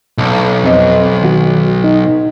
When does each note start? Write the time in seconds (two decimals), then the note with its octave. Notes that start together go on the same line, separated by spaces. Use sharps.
0.18 B1
0.63 F2 C4 D#5
1.22 D#3 F#4
1.84 D#4